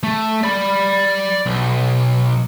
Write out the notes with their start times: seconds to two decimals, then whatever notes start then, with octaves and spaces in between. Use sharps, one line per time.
0.03 A3
0.43 D5 B5
1.46 B1